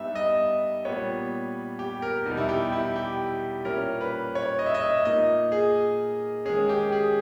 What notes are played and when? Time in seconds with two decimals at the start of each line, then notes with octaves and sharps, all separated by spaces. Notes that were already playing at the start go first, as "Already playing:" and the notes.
Already playing: G2 G3 B3 D#4 E5
0.15 D#5
0.85 A#2 G3 B3 C#5
1.79 G4
2.02 A#4
2.26 E2 B2 G3 B3 D#4
2.37 E4
2.49 G4
2.72 E4
2.96 G4
3.65 A#2 G3 C#4 A#4
4.01 B4
4.35 C#5
4.59 D#5
4.66 E5
4.74 D#5
4.82 E5
5.05 A#2 A#3 D#4 D#5
5.52 G#4
6.45 D#3 G#3 C#4 G#4
6.69 G4
6.92 G#4